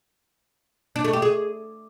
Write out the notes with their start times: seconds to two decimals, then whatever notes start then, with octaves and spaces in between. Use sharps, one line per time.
0.96 D4
1.04 A3
1.13 G4
1.22 G#4